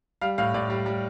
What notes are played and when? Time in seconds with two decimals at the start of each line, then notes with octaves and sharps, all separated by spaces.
0.21 G3 F5
0.38 A2 F5
0.54 A2 D5
0.70 G3
0.86 G3